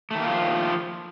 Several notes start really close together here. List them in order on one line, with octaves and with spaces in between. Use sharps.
A3 D#3 A#3 F4 F3